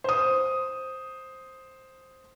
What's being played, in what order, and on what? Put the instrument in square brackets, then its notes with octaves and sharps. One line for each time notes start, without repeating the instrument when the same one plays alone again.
[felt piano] C5 D#6